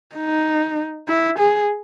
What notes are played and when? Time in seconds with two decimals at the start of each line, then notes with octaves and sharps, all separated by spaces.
0.15 D#4
1.08 E4
1.39 G#4